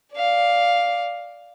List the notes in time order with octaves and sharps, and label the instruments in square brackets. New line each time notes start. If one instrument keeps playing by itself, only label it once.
[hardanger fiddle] D5 F5